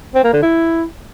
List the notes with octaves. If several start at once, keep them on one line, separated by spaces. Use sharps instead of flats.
C4
A#3
D3
E4